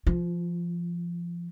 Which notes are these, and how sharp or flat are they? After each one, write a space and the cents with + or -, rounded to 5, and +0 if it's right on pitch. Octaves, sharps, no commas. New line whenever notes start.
F3 -20 F4 +10